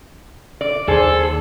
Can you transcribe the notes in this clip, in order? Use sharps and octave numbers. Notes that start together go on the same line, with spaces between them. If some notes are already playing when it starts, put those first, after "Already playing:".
D5
D#2 D#3 G#4 A4 C5